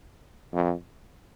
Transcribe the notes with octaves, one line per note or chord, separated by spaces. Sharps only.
F2